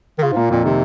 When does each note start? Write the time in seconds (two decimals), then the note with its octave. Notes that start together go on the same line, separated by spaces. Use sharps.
0.18 D#3
0.22 C#3 F4
0.32 G#2
0.36 A#2 A#3
0.51 F2 A#2
0.65 C3 D#3